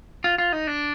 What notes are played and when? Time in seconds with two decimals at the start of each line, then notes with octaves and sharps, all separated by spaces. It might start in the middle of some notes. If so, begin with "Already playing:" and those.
0.24 F4
0.38 F4
0.53 D#4
0.67 D4